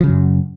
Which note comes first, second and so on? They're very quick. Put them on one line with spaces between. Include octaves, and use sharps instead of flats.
F3 C#3 F#3 F#2